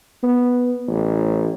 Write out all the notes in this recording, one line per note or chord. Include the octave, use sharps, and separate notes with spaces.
B3
A1